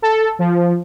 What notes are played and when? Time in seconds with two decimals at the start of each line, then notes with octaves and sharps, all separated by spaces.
0.02 A4
0.39 F3